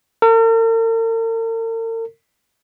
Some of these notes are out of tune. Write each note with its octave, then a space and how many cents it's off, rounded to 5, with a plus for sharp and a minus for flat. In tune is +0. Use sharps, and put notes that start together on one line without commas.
A#4 -45